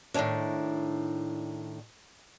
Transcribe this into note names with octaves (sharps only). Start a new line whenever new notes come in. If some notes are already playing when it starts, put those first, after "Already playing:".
A2 D#3 A#3 C#4 D4